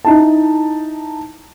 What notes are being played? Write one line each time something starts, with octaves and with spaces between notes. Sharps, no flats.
D#4 E4 A5